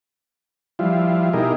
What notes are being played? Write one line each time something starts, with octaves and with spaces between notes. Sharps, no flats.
F3 G3 E4 F4
B2 D#4 E4 G4 G#4 A#4